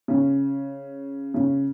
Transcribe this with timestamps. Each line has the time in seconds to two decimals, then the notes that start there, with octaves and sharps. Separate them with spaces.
0.08 C#3
1.34 C#3